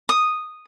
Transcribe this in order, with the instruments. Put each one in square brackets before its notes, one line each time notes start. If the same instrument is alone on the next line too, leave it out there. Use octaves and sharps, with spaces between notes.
[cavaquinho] D#6